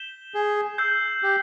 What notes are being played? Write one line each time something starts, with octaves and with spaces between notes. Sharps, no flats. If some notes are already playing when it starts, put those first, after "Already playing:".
Already playing: G6 B6 E7 G7
G#4
E6 G6 C7
G4